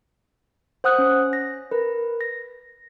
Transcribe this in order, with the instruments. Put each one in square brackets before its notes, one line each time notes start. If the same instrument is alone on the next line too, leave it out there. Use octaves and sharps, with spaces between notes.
[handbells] C5 F#5 D#6 F#6
C#4
A#6
A#4 B4
A#6